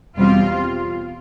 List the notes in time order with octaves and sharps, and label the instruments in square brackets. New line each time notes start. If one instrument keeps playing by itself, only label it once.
[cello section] E2 B2 G3 C4 F4